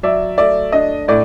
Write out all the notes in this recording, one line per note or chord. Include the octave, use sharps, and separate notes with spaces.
F#3 D5 E5
A3 D5 E5
D4 D#5
A2 D5